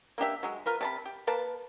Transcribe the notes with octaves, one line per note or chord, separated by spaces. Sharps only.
A#3 D4 G4 E5
F#3 G#3
F4 A#4 B4
C3 A5 B5
G4
A#3 B4 A5